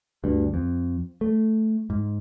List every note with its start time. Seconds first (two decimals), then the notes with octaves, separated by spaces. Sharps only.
0.24 D2 G2
0.54 F2
1.21 A3
1.90 G#2